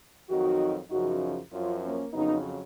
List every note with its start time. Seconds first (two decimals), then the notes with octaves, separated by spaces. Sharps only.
0.28 F2 D#3 F#3 D#4 F#4
0.90 F#2 C#3 F3 D#4 F#4
1.51 F#2 F3 C#4 F4
1.83 A#3 C#4
2.13 F2 C#3 F#3 B3 D#4